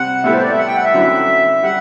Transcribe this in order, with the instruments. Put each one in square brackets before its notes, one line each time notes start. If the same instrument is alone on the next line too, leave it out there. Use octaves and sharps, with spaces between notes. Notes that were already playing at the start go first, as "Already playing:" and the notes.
Already playing: [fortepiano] C3 G3 C4 [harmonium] F#5
[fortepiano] A2 G3 B3 E4 A4 [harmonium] E5
[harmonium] C5
D5
E5
F#5
G5
F#5
E5
[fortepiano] F#2 D3 F#3 C4 E4
[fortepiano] G3 [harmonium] F#5